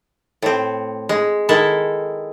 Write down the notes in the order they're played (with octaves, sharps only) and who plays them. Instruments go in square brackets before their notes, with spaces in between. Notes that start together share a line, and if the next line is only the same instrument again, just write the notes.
[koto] A2 C4
G#3
D#3 G#3 E4 A4